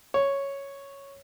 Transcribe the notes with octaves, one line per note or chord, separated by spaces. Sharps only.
C#5